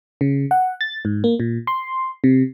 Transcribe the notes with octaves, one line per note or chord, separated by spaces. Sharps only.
C#3
F#5
A6
G#2
A#3
A#2
C6
C3